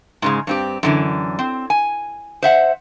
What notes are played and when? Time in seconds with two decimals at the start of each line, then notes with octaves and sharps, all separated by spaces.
0.22 G#2 C#3 G#3
0.47 G2 C4 G4
0.83 F#2 D3 E3
1.39 C4
1.70 G#5
2.42 C5 E5 F#5